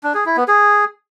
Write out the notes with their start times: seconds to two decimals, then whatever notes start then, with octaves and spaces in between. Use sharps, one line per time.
0.03 D4
0.14 G#4
0.26 E4
0.37 B3
0.48 G#4